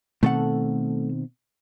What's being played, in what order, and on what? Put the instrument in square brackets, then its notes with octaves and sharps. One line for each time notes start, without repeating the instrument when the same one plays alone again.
[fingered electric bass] B2 D#3 C4 [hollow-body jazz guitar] A3 A4 F#5